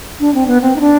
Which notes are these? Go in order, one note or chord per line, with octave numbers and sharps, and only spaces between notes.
D4
C4
B3
C4
D#4
D4